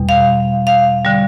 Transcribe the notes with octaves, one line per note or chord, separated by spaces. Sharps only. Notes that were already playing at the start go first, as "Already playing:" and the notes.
Already playing: E2 B2 G3
F5
F5
D3 G3